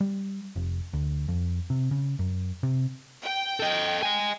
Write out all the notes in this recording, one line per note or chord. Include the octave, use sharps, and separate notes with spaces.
G3
F1
D2
F2
C3
C#3
F#2
C3
G5
A4 D#5
D#5 G#5